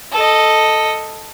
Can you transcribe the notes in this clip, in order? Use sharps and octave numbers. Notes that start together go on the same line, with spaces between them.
A4 D#5